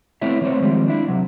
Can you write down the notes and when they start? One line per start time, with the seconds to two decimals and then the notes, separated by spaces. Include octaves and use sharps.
0.22 A3 B3 C4 E4 C#5 E5
0.41 E3 A3 B3 C4 C5 C#5
0.62 D#3 F3 G3 G#3 C4
0.88 D4 E4
1.08 C3 F#3